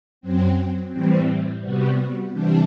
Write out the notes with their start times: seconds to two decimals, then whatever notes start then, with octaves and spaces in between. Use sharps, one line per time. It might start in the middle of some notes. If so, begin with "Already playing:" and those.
0.21 F#2 F#3 C4
0.92 A2 E3 G3 C4
1.62 C3 G3 B3 F#4
2.33 C3 E3 G3 D4